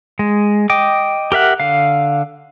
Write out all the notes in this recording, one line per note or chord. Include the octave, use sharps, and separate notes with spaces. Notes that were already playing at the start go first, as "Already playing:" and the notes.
G#3
D#5 G5 D6
G4 A#4 E5 F#5
D3 F5